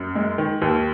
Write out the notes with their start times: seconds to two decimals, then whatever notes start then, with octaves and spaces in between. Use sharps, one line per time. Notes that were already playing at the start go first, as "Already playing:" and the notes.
Already playing: F#2
0.15 G#3
0.38 D#3
0.62 D#2